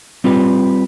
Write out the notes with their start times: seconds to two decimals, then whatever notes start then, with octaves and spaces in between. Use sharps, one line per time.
0.24 G3 C4 F4 G4 B4